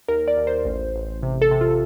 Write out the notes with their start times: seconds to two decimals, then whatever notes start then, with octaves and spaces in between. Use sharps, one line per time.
0.08 D#2 A#4
0.28 D5
0.37 D#2
0.47 C5
0.65 A1
0.95 A1
1.23 C3
1.42 A4
1.51 C3
1.61 F4